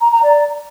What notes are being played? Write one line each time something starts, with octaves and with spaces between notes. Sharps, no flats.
A#5
A#5
D5